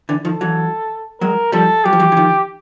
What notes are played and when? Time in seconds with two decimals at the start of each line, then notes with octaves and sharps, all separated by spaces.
0.09 D3 E3
0.25 D#3 F3 A4
0.41 E3 F#3
1.21 F#3 G#3 A#4
1.52 F3 G3 A4
1.85 F#3 G4
1.93 F3
2.00 E3 F#3
2.12 E3
2.17 D#3 F3